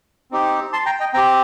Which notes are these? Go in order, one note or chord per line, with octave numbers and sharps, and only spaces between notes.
C4 D#4 G4
A5 C6
G5 A#5
D#5 G5
C4 G4 G5 A#5